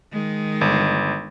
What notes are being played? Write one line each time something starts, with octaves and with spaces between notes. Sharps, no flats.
D#3 G#3
G1